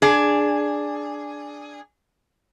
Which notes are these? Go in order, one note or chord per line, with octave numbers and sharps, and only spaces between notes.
D4 G#4